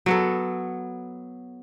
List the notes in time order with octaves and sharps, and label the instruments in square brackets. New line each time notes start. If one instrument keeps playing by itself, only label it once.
[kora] F#3 B3 A4